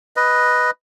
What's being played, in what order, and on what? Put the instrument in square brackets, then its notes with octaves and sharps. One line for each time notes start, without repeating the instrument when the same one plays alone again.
[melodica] B4 D#5